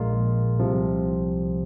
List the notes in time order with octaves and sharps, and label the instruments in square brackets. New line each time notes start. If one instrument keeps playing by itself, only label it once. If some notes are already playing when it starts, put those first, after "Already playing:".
Already playing: [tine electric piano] A#1 A#2 G#3 F4 A#4
C2 C3 F3